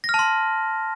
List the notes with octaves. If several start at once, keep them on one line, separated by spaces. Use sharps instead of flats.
A#6
F6
A5
C6